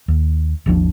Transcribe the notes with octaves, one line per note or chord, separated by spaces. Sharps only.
D#2
G#1 D#2 F3 D4